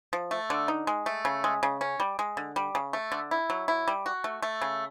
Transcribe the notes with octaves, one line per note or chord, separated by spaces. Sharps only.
F3
A3
D3
D#4
G#3
A3
C#3
G#3
C#3
C#4
G3
G#3
D3
G3
C#3
A3
D3
E4
F#3
E4
G3
F#4
A3
A3
C#3